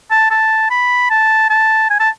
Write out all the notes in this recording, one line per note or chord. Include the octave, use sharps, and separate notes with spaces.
A5
A5
B5
A5
A5
G#5
A5